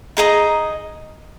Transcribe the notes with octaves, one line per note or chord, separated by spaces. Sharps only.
D#4 G#4 D#5 A#5